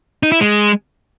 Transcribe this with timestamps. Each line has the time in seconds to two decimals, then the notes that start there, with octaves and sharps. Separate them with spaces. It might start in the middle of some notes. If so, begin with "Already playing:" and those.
0.23 D#4
0.32 E4
0.41 G#3